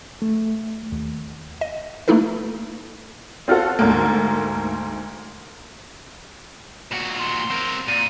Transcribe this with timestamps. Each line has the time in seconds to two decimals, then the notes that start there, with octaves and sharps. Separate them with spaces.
0.22 A3
0.92 D#2
1.61 D#5
2.08 A3 A#3 D#4 E4 A4 B4
3.48 C4 F4 F#4 A4
3.79 D2 G#2 A3 A#3
6.92 A#2 F#4
7.19 C6
7.50 C4 A#4
7.88 A#2 D#7